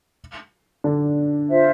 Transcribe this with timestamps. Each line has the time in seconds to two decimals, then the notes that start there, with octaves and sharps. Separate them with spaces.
0.84 D3 D4
1.49 F4 C5 E5